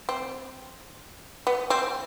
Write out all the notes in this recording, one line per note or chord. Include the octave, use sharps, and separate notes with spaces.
C4
B3
C4